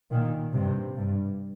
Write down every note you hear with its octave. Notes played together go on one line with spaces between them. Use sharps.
A#2 D#3
G2 C3
G2